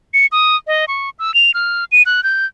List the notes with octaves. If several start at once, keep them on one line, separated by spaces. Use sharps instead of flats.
C#7
D#6
D#5
C#6
E6
F7
F6
D#7
F#6
G6